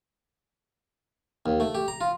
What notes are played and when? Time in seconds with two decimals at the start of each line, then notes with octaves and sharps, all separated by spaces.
1.46 D#2
1.60 A3
1.75 G4
1.88 A#5
2.01 F4